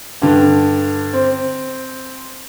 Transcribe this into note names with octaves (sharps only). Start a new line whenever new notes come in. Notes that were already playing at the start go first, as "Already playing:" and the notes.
G2 D3
C4